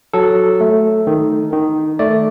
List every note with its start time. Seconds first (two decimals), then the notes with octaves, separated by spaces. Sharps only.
0.13 F#3 A4
0.61 A3
1.07 D#3
1.53 D#3
1.99 A3 D5